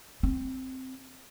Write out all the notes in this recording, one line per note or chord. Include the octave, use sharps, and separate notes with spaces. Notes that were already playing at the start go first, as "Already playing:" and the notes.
C4